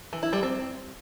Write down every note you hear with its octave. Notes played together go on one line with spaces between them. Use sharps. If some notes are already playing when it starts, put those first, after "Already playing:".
E3
E4
G3
C4